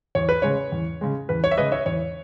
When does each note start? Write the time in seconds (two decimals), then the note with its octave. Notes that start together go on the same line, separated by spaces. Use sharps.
0.15 E2 C#5
0.29 B4
0.42 C#3 G#3 C#5
0.72 E2
1.01 C#3 G#3
1.29 E2 B4
1.44 C#5
1.51 E5
1.57 C#3 G#3 B4 D#5
1.72 C#5 E5
1.86 E2 C#5